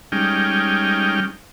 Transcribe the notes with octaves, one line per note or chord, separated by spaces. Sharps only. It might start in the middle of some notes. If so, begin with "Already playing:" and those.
G3 G#3 C#4 D#4 G5 F6